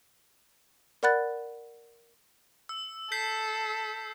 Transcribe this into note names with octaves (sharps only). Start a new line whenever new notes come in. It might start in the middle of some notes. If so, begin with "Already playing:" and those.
A#4 D5 F#5 B5 F#6 A6
E6
A4 G6 B6 C7